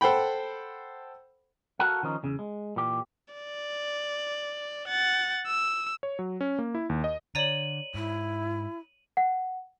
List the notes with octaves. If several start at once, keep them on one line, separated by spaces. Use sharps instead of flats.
A4 C5 F#5 G5 B5
F#4 A4 A#4 F5 F#5
D#3 F3 C#4 D#4
E2 C#3
G#3
A#2 E3 G4
D5
F#5 A6
E6
C#5
F#3
C#4
A#3
E4
D#2
D#5
D3 C#5 D5 A#5 D#7 F#7
G#2 E4
F#5